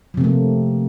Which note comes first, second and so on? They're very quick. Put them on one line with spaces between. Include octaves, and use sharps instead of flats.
F3 C3 A#3 A3